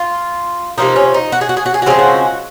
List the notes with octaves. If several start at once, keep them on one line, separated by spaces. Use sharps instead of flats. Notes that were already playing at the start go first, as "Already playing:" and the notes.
Already playing: F4
C3 F3 A#3 D#4
C#4
D#4
F#4
G#4
F#4
G#4
F#4
G#4
F#4
C#3 F3 G#3 C4 G#4
F#4